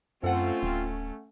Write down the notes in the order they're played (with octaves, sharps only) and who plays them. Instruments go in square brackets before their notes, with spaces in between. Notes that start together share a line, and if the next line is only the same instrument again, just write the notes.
[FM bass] F#2 [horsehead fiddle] A3 C#4 [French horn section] C4 F4 [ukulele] A4 F#5
[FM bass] D1